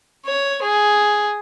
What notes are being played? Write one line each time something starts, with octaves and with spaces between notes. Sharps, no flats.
C#5
G#4